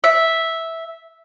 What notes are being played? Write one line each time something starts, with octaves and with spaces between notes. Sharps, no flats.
E5